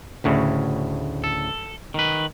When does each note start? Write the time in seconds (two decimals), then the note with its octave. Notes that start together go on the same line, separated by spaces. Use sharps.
0.24 D2 A2 C#3
1.24 A4
1.94 D#3 B4